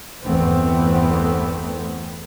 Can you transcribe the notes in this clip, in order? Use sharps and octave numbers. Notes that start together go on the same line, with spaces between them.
G1 E2 E3 A3 B3 C4